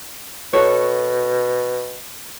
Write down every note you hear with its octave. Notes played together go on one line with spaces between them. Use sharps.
B2 F#4 A4 C#5